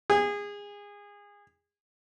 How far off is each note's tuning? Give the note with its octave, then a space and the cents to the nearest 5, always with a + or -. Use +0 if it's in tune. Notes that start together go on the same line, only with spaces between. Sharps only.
G#4 -25